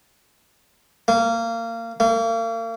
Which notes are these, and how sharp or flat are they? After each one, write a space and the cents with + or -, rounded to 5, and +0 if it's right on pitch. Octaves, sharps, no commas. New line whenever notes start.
A#3 -25
A#3 -40